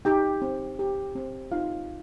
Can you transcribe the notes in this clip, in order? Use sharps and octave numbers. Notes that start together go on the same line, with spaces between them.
D#4 G4 G5
C4
G4
C4
D#4 F4 F5